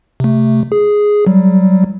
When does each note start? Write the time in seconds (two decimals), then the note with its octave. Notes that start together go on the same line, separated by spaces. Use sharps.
0.20 C3 A3
0.72 G#4
1.27 F#3 G3